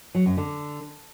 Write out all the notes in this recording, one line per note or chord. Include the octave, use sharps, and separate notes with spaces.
F#3
F#2
D3